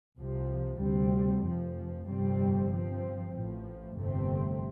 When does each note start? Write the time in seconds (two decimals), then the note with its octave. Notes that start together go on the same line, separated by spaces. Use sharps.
0.16 C2 C3 F3
0.80 D2 C3 G3 C4
1.43 F1 F2 F3
2.06 G1 F2 C3 G3 C4
2.69 G2 F3 C4
3.32 A1 A2 F3
3.96 G1 F2 C3 A3 C4